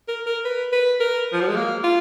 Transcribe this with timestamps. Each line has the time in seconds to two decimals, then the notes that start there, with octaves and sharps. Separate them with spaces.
0.08 A#4
0.26 A#4
0.45 B4
0.73 B4
1.00 A#4
1.33 F3
1.41 F#3
1.48 G#3
1.56 A#3
1.84 F4